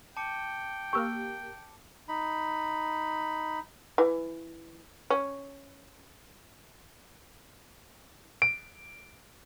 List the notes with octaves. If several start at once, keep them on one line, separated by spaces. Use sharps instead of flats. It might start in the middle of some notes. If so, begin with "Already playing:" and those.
G5 A5 D6 C#7
A#3 G4 C#6 E6 F6
D#4 B5
E3
C#4
D7